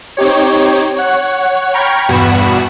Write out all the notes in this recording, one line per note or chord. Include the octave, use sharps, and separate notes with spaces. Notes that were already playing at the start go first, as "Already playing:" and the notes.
C4 D#4 G4 C#5
C#5 F#5
G5 A#5 B5 C#6 F6 G#6
E2 G2 B2 F#4 B5 E7